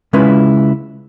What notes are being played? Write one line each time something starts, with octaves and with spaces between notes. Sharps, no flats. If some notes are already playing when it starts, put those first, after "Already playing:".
C#3 G#3 C#4 E4 F4 B4